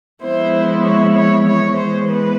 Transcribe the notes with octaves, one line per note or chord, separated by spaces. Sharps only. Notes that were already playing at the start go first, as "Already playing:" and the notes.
F3 G#3 B3 E4 C5
C#5
C#5
E3 G#3 B3 C#5
C5
B4